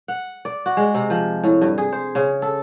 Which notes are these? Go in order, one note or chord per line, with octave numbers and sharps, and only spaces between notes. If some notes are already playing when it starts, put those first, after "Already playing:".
F#5
D5
F#4
G#3
C3
F3
A2
G2
G#4
C5
C#3
A4